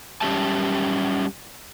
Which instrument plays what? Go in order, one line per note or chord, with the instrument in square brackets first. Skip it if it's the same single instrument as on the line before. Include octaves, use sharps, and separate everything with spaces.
[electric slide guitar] G3 C#4 G4 E5 A5